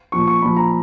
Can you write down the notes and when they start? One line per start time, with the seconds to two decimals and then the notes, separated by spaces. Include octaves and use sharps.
0.12 A#2 F3 C#6
0.27 C#6
0.41 A#2 F3 B5
0.57 A#5